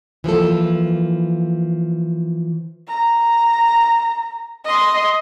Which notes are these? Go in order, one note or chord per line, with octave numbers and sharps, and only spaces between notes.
E3 F3 A#3 A4
A#5
D#5 C6